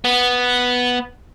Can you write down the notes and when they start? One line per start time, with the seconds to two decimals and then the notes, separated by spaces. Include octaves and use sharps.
0.04 B3